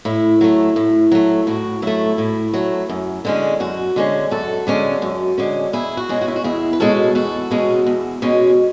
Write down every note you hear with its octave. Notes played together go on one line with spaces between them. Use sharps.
A2 E4
F#3 A3
A2
F#3 A3
A2 F#4
F#3 A3 E4
A2
F#3 A3
F#2
D3 G#3 C#4
F#2 F#4
D3 G#3 C#4
F#2 F#4 A4
D3 G#3 C#4
F#2
D3 G#3 C#4
E2 E4 G#4
F#4
B2 G#3 C#4
F#4
E4
F#4
E2 E4 G#4
B4
B2 G#3 C#4 F#4 A4
E2 F#4 A4
B2 G#3 C#4
E2
B2 G#3 C#4